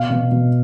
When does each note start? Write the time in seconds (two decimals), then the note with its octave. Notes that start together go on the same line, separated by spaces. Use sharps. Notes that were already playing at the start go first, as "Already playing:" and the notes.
Already playing: B2 F5
0.10 B2
0.32 B2